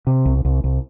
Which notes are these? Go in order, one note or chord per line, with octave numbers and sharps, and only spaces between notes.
C3
C2
C2
C2